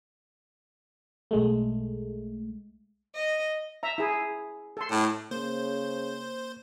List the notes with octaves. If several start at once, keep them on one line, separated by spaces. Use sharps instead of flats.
B1 G#3 A3
D#5
E5 A#5
E4 G#4
A4 C6
A2 A5
C#3 A#3 C5